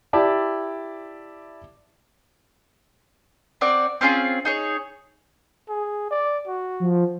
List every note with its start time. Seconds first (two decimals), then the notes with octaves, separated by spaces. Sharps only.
0.13 E4 G4 D5 E5 A5
3.61 C4 F#4 D5
4.01 C4 C#4 F4 G#4
4.45 D#4 G#4 C#5
5.69 G#4
6.11 D5
6.47 F#4
6.80 F3